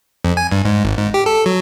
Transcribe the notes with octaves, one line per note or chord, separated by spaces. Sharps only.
F2
G#5
G2
G#2
G#1
G#2
G4
A4
F#3